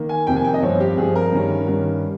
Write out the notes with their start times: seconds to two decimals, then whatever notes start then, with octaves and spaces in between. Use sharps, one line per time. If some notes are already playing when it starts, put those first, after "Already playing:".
Already playing: D#3 A#3
0.09 G#5
0.27 F2 C3 D#3 A#3 G5
0.36 G#5
0.45 G5
0.54 D#5
0.62 G2 F3 C4 C#5
0.80 G4
0.98 G2 F3 C4 G#4
1.16 A#4
1.32 G2 D#3 G3 C#4
1.67 G2 D#3 G3 C#4